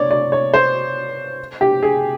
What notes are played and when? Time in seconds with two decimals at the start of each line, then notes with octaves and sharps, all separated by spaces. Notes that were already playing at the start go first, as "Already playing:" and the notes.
Already playing: C#5 D5
0.11 D5
0.32 C#5
0.54 C5
1.61 G4
1.83 G#4